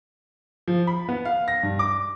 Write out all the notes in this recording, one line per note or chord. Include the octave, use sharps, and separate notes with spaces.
F3
B5
B3
F5
A#6
G2
D6